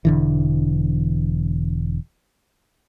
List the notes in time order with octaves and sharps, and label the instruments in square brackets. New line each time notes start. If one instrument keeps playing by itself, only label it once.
[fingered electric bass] E1 D3 E3